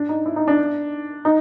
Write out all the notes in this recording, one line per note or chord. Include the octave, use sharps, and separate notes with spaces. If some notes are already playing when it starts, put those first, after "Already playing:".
Already playing: D4
D#4
E4
D#4
D4
D#4